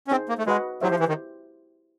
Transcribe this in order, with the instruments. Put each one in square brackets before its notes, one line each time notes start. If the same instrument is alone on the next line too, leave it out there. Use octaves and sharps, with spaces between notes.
[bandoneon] C#4
[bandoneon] C4 [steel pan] D#4 G#4 C5
[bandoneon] A#3
A3
[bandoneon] G#3 [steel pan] F#4 B4 D#5 F#5
[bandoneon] F#3 [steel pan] E4 G4 C5 E5
[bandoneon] F3
E3
D#3